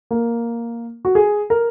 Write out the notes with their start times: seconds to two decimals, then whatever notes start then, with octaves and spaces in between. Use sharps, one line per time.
0.11 A#3
1.05 F#4
1.15 G#4
1.50 A#4